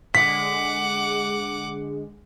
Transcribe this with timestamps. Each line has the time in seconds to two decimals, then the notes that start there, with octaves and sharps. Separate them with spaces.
0.15 D3 G#3 F#5 D6 B6